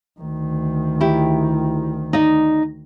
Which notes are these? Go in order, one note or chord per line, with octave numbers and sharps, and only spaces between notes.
D2 D#3
E4 G4
D#4 D5 D#5